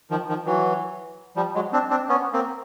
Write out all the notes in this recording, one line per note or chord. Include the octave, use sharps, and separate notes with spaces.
D#3 F3
D#3 F3
E3 F#3
F3 G3
F#3 G#3
C4 D4
C4 D4
B3 C#4
A#3 C4